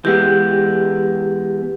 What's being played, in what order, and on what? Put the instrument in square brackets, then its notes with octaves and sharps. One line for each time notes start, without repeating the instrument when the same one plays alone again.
[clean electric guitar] E3 G#3 B3 [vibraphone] G4